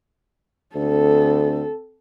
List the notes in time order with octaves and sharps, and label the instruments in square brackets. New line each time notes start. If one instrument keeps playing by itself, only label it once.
[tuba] D2 [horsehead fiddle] C4 A4